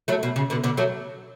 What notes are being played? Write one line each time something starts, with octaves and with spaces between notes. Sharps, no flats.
F#3 A3
B2
C#3
B2 D3
B2 D3
F#3 A3